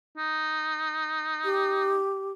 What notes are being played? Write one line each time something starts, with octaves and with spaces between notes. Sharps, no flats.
D#4
G4